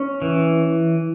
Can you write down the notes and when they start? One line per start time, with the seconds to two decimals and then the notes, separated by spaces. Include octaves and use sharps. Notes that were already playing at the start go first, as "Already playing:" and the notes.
Already playing: C#4
0.22 E3